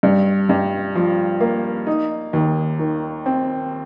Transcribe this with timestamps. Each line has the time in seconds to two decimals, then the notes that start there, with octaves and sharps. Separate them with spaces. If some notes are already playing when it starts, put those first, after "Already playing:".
0.03 G2
0.49 G2
0.95 F3
1.40 A#3
1.87 D#4
2.33 D#2
2.79 D#3
3.26 C4